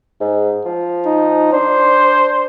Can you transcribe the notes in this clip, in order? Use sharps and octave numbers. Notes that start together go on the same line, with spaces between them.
G#2
F3
D#4
D4 C5